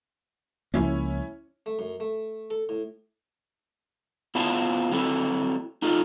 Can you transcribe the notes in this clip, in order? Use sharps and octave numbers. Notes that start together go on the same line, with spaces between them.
C#2 F3 A#3 C#4 E4 C#5
A3
F#2
A3
A4
A2
B3 E4 F4 C5 E5 A5
F#3 A3 C4 E4 A4
D#4 F4 A4